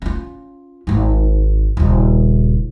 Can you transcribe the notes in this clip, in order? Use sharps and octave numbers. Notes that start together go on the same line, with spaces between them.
C#4 F4
G#1 D#4
D#1 C#3